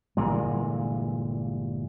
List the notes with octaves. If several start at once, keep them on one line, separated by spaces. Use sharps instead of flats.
G1 A#2 E3 G#3